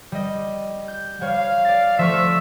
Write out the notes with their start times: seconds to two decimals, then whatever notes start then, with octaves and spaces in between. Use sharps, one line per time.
0.12 G3 D#5
0.88 G6
1.21 G3 C#5 F5
1.65 D5 A6
1.99 F3 A3 E5 C#6